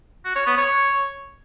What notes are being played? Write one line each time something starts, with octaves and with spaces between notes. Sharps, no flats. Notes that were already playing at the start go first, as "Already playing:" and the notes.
F#4
C#5
B3
C#5